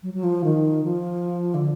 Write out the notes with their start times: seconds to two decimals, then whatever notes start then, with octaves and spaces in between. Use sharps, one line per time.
0.03 F#3
0.13 F#3
0.23 F3
0.44 D#3
0.84 F3
1.54 D3